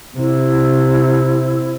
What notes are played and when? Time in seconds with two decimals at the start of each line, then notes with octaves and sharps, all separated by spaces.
0.18 C3 E4